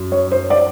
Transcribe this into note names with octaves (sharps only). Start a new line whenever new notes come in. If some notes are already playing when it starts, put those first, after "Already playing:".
Already playing: F#2
C#5
C5
D5